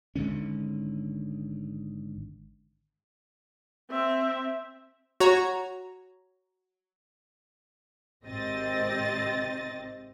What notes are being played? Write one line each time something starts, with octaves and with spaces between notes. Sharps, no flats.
G#1 G#2 D3 C#4
C4 E5
F#4 C#5 A#5
G#1 C3 C4 D#5 A6